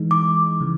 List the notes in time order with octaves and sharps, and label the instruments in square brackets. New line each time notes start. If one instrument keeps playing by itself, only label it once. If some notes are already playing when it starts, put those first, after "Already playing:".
Already playing: [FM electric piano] E3 G#3 D#4
[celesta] D6
[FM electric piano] C#3 E3